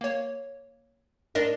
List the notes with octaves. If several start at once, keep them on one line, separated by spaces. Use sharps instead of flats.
A#3 C#5
D4 A#4 D#5